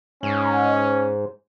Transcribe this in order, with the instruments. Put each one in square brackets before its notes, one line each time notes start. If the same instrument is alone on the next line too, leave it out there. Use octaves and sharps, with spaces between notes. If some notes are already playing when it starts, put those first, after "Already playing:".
[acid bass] G#2 [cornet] C#4